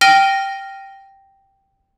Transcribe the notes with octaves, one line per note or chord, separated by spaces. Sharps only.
G5 F6 A#6 D#7 G7